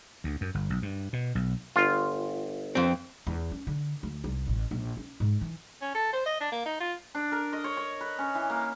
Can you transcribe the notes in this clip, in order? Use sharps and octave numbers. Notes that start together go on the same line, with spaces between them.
D2
F#2
G1
B1
G2
B2
B1
G1 F4
F2 C4
E2
C#4
D3
D2
C2
A1
A#1
C#4
G#2
E3
C#4
A4
C5
D#5
D4
A#3
D#4
F4
D4
A#4
D#5
C#5
C#5
B4
C#4
E3
A#3